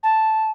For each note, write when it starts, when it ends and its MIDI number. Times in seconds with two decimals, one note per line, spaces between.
0.03 0.51 81